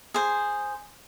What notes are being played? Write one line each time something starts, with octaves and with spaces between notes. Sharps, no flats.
G#4 C5